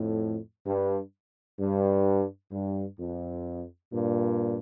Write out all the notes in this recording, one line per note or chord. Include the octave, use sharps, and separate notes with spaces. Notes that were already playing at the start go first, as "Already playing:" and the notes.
Already playing: F2 A2
G2
G2
G2
F2
G2 A#2